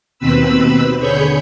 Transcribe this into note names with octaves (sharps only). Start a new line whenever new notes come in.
D#2 B2 C4 B4 B5 E6
D3 G#4 C#5 B5 C#6 G6